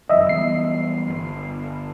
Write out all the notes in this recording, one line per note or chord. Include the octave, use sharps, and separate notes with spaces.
F1 F#2 E3 D#5 E5
E3 G3 B3 C7
G1